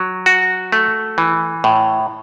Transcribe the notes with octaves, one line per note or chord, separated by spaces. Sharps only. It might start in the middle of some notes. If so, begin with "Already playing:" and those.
Already playing: F#3
F#4
A3
E3
A2